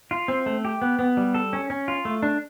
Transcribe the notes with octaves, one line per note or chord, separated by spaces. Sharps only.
F4
C4
A3
G4
B3
B3
G3
A4
C#4
C#4
F4
A3
D4